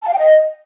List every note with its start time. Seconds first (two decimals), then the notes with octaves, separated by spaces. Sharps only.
0.03 A5
0.08 F5
0.13 G5
0.18 D#5